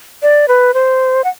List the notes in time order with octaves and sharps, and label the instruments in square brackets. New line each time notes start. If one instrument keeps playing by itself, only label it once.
[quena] D5
B4
C5
F#5